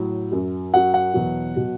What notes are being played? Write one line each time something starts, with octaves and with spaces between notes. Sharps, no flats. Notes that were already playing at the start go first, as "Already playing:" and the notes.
Already playing: A2 F#3
F#2 F#3
F#2 F#3 F#5
F#5
E2 B2 F#3
B2 F#3